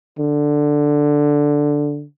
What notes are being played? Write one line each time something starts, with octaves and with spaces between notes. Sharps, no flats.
D3